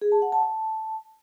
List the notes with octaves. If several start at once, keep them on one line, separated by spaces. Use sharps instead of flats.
G#4
A5
F#5
A5
A5